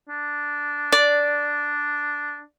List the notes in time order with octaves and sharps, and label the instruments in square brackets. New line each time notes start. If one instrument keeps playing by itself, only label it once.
[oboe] D4
[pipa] D5